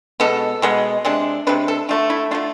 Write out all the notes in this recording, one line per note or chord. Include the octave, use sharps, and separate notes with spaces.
B2 G#3 B3 A4
B2 G#3 B3
C3 G#3 D4
C3 G#3 D4 B4
A4
D3 A3 D4 F4
E4
D3 A3 D4 F4